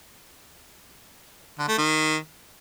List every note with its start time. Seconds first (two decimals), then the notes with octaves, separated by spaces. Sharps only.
1.58 D3
1.68 A3
1.78 D#3